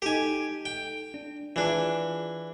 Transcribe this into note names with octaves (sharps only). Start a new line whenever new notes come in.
D#4 G4 A4 G#5
G5
D4
E3 D4 F4 G#4